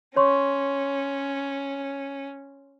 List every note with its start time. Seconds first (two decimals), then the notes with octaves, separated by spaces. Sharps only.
0.16 C#4 C#5 C6 C#6